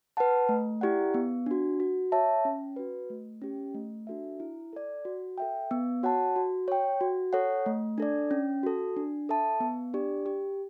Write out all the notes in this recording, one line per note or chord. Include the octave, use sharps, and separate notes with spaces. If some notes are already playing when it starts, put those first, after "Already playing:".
B4 F#5 A5
A3
E4 G4 D5 F#5
B3
D4 F#4
F#4
C#5 E5 A5
C#4
F#4 B4
A3
C#4 G4
A3
D4 F#4 A4 E5
E4
A4 D5
F#4
A4 E5 G5
B3
F#4 C#5 F#5 A5
F#4
C#5 G5
F#4
A4 C#5 F#5
A3
D4 A4 D5
C#4
F#4 A4
D4
A4 E5 A5
B3
D4 G4 D5
G4